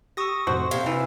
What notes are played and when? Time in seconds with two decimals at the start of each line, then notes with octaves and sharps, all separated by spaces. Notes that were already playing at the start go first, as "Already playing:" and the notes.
0.17 G4 C#6 D#6 E6 A#6
0.47 F2 A2 C3 F#4 C5
0.71 C3 F5 G#6
0.86 E3